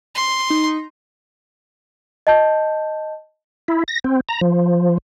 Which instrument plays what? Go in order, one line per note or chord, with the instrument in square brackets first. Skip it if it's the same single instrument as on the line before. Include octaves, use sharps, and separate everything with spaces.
[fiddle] C6
[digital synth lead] D#4
[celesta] D#5 A5 G6
[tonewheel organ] E4
A#6
C4
A#5
F3